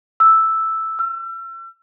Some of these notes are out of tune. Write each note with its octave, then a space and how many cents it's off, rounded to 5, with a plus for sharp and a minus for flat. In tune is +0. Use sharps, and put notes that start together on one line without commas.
E6 +0
E6 +40